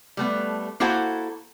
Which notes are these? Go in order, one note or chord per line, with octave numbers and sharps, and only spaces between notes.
G3 A3 B3
A#3 E4 F#4 A4 C5 F#5